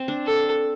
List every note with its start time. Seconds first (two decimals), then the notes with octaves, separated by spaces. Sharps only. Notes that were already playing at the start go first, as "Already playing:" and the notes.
Already playing: C4
0.08 D4
0.26 A4